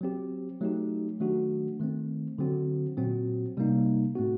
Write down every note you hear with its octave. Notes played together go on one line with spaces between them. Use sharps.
F#3 C4 G4
F#3 A3 D#4 G4
D#3 F#3 A3 D4 F#4
D#3 A3 C4
D3 F#3 C4 F#4
A#2 F#3 C4 F#4
C3 G3 A#3 D#4
A2 A3 C4 F#4